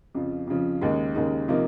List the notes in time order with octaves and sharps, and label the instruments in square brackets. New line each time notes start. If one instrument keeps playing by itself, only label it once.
[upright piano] F2 C#3 F3
F2 C#3 F3
D#2 C#3 G#3 D#4
D#2 C#3 G#3 D#4
C3 F3 A#3 D#4